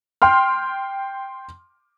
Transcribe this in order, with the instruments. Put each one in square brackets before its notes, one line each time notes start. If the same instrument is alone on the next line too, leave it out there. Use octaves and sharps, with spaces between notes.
[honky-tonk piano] G5 C6 F6